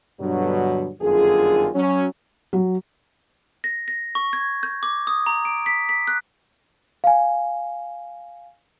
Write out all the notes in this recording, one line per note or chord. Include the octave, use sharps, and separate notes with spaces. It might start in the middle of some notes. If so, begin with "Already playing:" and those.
G2 B2 D3 F#3
G1 F#2 D3 D#3 F4 G#4
F#3 C#4
F#3
A#6
A#6
C#6
G#6
G6
D6
D#6
A#5
D7
B6
B6
F#6
F5 G#5